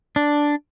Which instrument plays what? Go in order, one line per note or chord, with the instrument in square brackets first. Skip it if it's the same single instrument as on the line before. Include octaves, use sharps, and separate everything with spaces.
[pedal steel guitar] D4